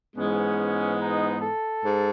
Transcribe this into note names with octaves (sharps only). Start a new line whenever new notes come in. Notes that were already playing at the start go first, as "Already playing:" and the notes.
G#2 E3 G#3 B3 C#4
D#4
A4
G#2